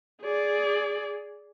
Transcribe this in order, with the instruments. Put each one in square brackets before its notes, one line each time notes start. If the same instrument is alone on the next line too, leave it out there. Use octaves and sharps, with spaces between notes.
[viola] G#4 D5